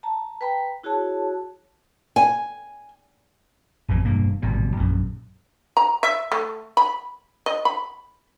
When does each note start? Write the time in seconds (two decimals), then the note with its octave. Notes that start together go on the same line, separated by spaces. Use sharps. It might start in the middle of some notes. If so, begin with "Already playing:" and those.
0.03 A5 A#5
0.41 B4 G5 A#5 B5
0.83 E4 F#4 G#4 C#5 A5
2.16 G#5
3.88 A1 F2 E3
4.05 E1 G2 A#3
4.42 D1 G#1 B2 G3
4.77 A#1 F#2
5.77 A#5
6.03 E5
6.32 A3
6.77 B5
7.46 D#5
7.65 B5